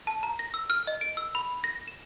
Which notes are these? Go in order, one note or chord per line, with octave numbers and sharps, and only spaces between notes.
A5
A#5
A#6
E6
F6
D#5
D7
E6
B5
A#6
E7